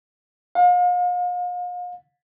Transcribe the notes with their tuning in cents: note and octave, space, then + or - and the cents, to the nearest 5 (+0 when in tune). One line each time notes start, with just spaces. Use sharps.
F5 +40